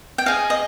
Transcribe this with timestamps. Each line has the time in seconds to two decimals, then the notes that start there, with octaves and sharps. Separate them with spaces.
0.18 G5
0.26 G#4 D#5 F5
0.50 D#5